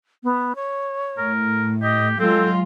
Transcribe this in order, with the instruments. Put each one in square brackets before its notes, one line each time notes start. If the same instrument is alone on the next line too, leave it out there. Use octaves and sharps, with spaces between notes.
[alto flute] B3
C#5
[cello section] A2 [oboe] A#4
[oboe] G4 [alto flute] D#5
[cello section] F#3 G#3 F4 [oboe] C4 [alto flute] A4